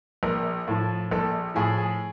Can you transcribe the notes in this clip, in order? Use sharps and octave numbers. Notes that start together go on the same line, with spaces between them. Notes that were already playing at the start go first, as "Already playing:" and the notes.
A#1 A#4
A2 F3
A#1 A4
A2 F3 G#4
G#4